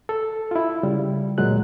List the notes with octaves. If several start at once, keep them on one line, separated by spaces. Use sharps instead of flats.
A4
E4 F4
C#3 G3
D2 A#2 F#3 G#3 F#6